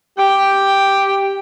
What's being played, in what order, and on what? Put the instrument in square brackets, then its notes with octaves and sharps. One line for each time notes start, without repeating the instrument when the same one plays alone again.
[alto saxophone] G4 [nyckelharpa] G5